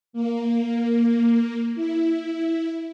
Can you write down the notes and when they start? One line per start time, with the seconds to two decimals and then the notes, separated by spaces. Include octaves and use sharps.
0.13 A#3
1.75 E4